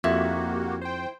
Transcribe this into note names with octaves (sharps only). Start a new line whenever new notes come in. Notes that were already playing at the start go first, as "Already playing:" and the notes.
F2 A#3 E4 F#4 G4
C5 G5